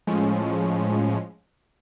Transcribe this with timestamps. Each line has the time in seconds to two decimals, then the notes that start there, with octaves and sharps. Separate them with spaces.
0.07 A2 F3 G#3 C#4